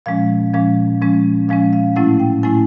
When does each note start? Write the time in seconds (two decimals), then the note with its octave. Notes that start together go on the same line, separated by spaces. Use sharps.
0.06 A#2 F3 G#3 C#4 F5
0.53 A#2 F3 G#3 C#4 F5
1.02 A#2 F3 G#3 C#4
1.48 A#2 F3 G#3 C#4 F5
1.73 F5
1.96 A2 F#3 A3 C#4 E4 F#5
2.20 G5
2.43 A2 F#3 A3 C#4 E4 G#5